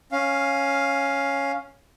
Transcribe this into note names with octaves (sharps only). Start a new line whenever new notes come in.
C#4 F5